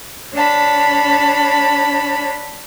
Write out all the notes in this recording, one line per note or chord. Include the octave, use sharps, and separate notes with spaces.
D4 C#5 A5 B5